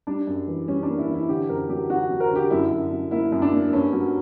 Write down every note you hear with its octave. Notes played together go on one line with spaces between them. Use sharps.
G3 D4
F#2
E3
G3 C#4
D4
A#3
E4
E3
E4
D3 G4
F#2 A#4
F#3 G4
F#3 F#4
F#3
A#4
D3 G4
F#2 E4
F#2
F#2
A#3 E4
F#2
D4
A#3
G2 C#4
F#3